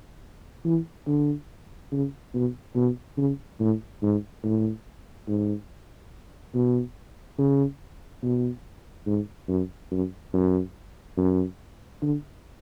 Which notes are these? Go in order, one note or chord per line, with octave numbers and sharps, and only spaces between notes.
E3
D3
C#3
B2
B2
C#3
A2
G#2
A2
G#2
B2
C#3
B2
G#2
F#2
F#2
F#2
F#2
D3